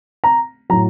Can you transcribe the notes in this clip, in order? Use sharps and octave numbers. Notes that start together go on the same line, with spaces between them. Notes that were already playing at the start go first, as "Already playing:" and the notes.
A#5
A2 F#3 A#5